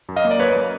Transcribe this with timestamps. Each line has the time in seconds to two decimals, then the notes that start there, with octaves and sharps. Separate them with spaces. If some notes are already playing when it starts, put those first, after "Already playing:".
0.09 F#2
0.16 D#5 F5
0.25 A#3
0.31 D5
0.40 F#2 B4 C#5
0.56 A#3